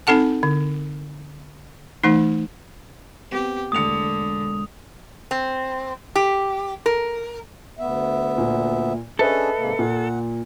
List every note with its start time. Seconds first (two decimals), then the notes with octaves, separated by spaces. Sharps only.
0.07 C4 D#4 A4 F#5 A5
0.43 D3
2.04 E3 A3 D#4
3.31 B3 C4 G4
3.72 E1 D2 D3 D#6 C#7 F7
5.31 C4
6.16 G4
6.86 A#4
7.79 D2 B3 E5
8.38 A#2
9.19 C#4 D4 G#4 A4 B4 D#5 E5
9.58 G#2 C3 A#3
9.79 A#2 F#5